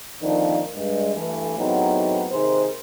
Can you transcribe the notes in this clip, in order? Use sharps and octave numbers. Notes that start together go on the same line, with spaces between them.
D3 D#3 F3 A#3 C4 D4
G2 G#3
G2 E3 A3
E2 A2 F#3 B3 C4 D#4
C3 D#3 G#4 A#4 C5